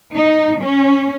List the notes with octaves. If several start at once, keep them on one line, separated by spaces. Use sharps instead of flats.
D#4
C#4